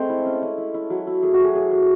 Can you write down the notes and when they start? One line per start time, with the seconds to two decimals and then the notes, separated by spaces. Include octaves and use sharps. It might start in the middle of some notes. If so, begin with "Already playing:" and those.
Already playing: G#3 A3 C4 A4 C5
0.09 E4
0.26 C#4
0.42 C#4
0.58 E4
0.74 E4
0.90 F#3
1.07 E4
1.23 A3 G#4
1.34 F#4
1.39 F#3
1.44 G#4
1.55 F#3 G#4
1.71 A3